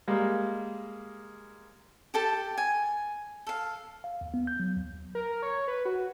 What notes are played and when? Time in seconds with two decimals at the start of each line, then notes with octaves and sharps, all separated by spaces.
0.08 G3 G#3 A#3
2.14 G4 A4 A5
2.57 G#5
3.47 A4 F5
4.04 F5
4.21 D#2
4.34 B3
4.47 G6
4.60 F#3
4.77 D#2
5.15 A#4
5.43 C#5
5.68 B4
5.85 F#4